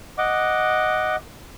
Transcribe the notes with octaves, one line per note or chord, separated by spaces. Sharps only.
D#5 F#5 D6